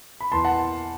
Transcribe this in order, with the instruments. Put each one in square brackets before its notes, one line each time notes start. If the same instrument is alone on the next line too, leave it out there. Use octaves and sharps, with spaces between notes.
[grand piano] B5
E2 A5 C6
F#5 A5